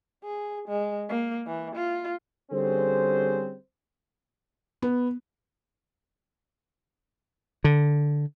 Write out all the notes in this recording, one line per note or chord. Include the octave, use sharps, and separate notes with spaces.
G#4
G#3
A#3
E3
F4
D3 G3 C4 C#4 G#4 C5
B3
D3